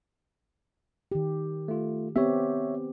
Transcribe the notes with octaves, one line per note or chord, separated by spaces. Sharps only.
D#3 G4
A3 F4
B3 C4 G4 C#5 E5